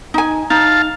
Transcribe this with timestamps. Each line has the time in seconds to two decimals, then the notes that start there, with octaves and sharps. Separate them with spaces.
0.14 D#4 G#5
0.50 D#4 F5 A5